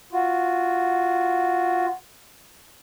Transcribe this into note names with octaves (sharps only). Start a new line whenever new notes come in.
F4 F#4